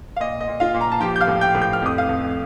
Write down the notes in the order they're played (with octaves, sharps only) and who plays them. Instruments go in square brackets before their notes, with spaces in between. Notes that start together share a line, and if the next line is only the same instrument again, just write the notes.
[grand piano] F5
A#2 D#5
D#5
A#2
F4 F5
A#2
A#5
A5
F3 G4 G5
G6
F5 F6
A2
G5 G6
A2
G6
F6
F2 D#6
F5 F6
F2